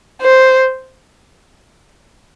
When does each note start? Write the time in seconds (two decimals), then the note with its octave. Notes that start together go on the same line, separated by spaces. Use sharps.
0.22 C5